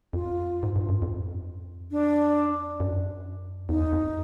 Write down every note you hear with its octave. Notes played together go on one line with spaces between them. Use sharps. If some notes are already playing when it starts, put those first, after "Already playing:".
F2 F4
G#2
G2
F#2
F2
D4
F#2
E2 D#4
F2